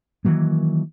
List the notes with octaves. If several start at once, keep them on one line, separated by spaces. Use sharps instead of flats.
D#3 E3 F#3 A#3